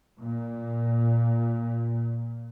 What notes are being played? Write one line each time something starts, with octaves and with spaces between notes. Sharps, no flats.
A#2